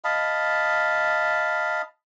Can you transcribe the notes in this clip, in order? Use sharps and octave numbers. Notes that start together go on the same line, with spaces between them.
D#5 F5 A5 B5